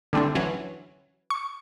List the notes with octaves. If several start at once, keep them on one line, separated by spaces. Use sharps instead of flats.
D3 G3 A3 C4 D4
E3 F#3 C#4
C#6